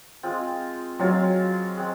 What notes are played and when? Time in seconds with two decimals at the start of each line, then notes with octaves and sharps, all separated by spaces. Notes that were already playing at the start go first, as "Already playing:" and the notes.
0.23 G#3 C4 F4
0.99 F#3 G#3 C4 F4
1.77 G#3 C4